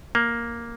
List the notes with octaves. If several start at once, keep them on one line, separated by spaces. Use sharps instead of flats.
A#3